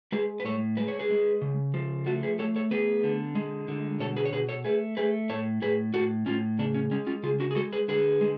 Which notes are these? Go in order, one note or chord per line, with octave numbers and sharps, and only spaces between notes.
G#3 G#4 B4
B4
A2 A4 C#5
G#3 B4
C#5
G#4 B4
G#3
C#3
F3
A3 F#4 A4
G#4 B4
A3 A4 C#5
A4 C#5
B3 G#4 B4
D3
G#3
D3
B2 A4 C#5
G#4 B4
C#5
B2 G#4 B4
A4 C#5
A3 G#4 B4
A3 G#4 B4
A2 A4 C#5
A2 G#4 B4
A2 F#4 A4
A2 C#4 F4
C#3 B3 D4
C#4
G#3 C#4
C#4 F4
C#3 F4 G#4
D4 F#4
G#4
G#3 F#4 A4
G#4 B4
D3 G#4 B4
G#3